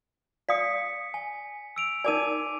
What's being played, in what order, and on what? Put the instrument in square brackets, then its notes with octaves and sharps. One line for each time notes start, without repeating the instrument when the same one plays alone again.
[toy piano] D5 F5 D#6 [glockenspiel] B6 C#7
[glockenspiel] G#5
E6 D7 F7
[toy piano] D#4 A#4 D5 [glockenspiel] G#5 D6 D#7